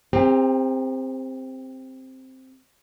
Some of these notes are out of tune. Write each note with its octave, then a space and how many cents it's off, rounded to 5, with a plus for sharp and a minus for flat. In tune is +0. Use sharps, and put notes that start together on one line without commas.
C4 +0 G4 +45 A#4 +0